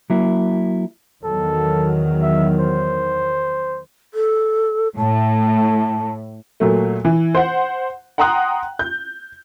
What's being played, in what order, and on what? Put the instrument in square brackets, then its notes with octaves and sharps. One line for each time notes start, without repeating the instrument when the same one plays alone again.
[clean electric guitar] F#3 A#3 E4
[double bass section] E2 D#3 F#3 [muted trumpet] A4
[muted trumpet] E5
C5
[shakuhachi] A4
[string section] A2 [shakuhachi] A5
[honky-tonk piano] A#2 F#3 A3
E3
C5 F#5
F#5 G5 A#5 C6 D#6 F#6
G6